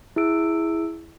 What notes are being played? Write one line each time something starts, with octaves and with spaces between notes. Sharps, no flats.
E4 G#4 E6 D7